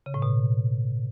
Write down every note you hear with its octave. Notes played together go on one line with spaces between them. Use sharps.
C#3
A2
B2